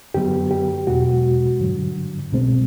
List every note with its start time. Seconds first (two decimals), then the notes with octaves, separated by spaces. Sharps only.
0.14 F#2 D3 F#3 B3 G4
0.51 G4
0.87 E2 B2 G#3 F#4
1.60 G2 D3 F#3
2.32 C2 B2 G#3 C4